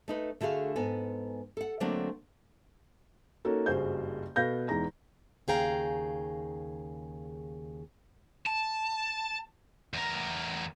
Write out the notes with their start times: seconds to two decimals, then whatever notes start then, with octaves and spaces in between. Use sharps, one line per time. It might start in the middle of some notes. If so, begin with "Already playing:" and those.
0.08 A3 D#4 B4
0.41 D3 A3 F#4 G#4 F5
0.76 G#2 B3 A4 G#5
1.57 A4 F#5
1.80 D3 F#3 A3 A#3 C4 D4
3.45 A#3 C#4 D#4 F#4 A4
3.66 F#1 G2 F#4 G#4 C5 G6
4.36 B2 A4 B4 F5 G6 A#6
4.68 E2 E3 G#3 D#4 A#5 A#6
5.48 D#2 C#3 G#4 F5 G5 A#5
8.46 A5
9.94 E2 A#4